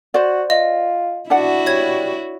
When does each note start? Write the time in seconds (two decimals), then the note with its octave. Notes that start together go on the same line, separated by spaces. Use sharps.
0.14 F#4 C5 D5
0.50 F4 D#5
1.30 D4 E4 F#4 D5 F#5
1.66 G3 C#5 G#6